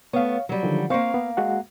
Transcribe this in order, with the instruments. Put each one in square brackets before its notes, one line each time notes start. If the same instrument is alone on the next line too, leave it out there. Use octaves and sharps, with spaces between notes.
[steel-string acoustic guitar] A3 B3 [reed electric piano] C#5 F5
[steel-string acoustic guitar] F#3 G3
[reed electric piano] D3 D#3 F3
[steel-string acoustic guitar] A#3 F5 [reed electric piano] C4 C5 C#6
[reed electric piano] B3
G#3 F#4 F#5